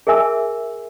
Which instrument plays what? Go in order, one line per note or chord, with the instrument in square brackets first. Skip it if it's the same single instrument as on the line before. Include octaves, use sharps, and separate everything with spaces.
[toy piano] G#4 A#4 E5 G#5 E6